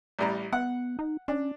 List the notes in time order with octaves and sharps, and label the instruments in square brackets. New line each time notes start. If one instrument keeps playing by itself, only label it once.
[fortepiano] A1 G3 A#5
[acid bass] B3 [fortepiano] F#5
[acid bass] D#4
[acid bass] C#4 [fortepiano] D4